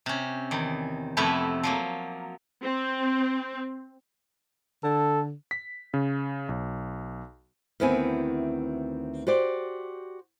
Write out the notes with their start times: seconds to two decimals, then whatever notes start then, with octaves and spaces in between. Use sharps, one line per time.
0.06 C3 C#4
0.51 E2 D#3
1.17 F2 C3 A3 B3 E4 B4
1.63 F3 F#3 A#3
2.63 C4
4.83 D3 A4
5.51 B6
5.94 C#3
6.49 B1
7.80 D2 D#3 B3 C4 E4 G#5
9.27 F#4 G4 C5 D5